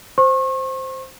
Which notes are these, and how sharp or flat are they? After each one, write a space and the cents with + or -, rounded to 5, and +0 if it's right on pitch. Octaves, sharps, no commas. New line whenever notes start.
C5 +0 C#6 -40